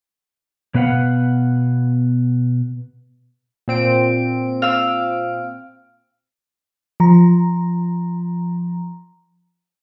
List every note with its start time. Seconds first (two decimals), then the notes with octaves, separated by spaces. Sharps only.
0.74 B2 B3 B4 F5 F#5
3.68 A#2 C4 D7
4.62 F5 E6
7.00 F3 A#5